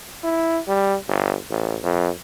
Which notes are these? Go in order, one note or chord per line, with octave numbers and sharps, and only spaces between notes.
E4
G3
G1
A1
F2